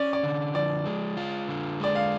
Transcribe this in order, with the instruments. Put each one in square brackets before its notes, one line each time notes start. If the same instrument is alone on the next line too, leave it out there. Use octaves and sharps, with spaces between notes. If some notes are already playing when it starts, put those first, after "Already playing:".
Already playing: [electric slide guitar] C#4 [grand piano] D5
[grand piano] D5
[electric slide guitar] D3
[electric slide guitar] F3 [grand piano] D5
[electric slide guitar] G#3
F4
D3
[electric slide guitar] G#3 [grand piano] D5
[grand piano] F5